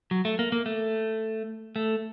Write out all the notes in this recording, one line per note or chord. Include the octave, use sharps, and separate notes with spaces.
F#3
A3
A#3
A#3
A3
A3